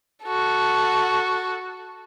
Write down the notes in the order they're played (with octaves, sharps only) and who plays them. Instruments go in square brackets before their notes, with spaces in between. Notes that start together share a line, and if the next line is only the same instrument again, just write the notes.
[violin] F#4 A4